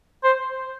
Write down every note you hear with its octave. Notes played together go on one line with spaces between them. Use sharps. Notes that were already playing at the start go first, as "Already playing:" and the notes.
C5